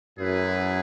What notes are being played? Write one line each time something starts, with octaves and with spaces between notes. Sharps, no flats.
F#2 A3 E4 G#4 B4